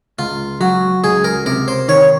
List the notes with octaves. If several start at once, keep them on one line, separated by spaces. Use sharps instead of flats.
C#2 F4
F#3 F#4
C#2 G#4
A#4
C3 A#4
C5
D#3 C#5